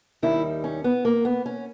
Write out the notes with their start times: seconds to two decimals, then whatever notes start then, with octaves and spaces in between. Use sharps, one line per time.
0.22 D#2 D#3 G3 E4
0.64 C#4
0.84 B3
1.05 A#3
1.25 B3
1.46 C#4